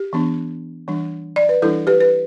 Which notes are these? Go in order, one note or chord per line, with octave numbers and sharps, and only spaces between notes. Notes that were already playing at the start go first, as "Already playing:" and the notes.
Already playing: G4
E3 B3 D4
E3 G3 D4
D5
B4
E3 G3 D4 E4 A4
G4 B4
B4